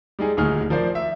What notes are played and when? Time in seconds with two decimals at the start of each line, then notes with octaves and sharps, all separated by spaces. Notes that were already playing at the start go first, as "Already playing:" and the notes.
0.19 G3 G#3 D#4 G#4
0.37 D#1 D2 D#4 G#4 F6
0.70 F3 A#4 C5 D5
0.95 E5